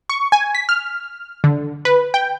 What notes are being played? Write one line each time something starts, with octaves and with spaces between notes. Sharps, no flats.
C#6
G#5
B6
F6
D3
B4
G5